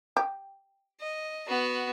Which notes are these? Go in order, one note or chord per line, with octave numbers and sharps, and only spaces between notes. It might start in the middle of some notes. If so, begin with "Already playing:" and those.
G4
D#5
B3 F#4